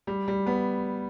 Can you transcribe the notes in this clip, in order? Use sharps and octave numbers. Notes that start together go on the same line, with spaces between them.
G3
G3
B3